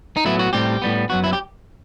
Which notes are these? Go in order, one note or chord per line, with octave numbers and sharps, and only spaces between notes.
D#4
A2 F#3 B3 E4
F#4
A2 G3 C4 G4
A2 G3 B3
F#2 F#3 B3 F#4
E4
G4